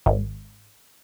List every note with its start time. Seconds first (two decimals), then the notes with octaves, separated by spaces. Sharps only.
0.06 G#1